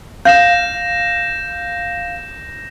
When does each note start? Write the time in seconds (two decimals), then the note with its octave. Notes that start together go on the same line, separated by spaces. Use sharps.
0.25 F5 G6 A#6 E7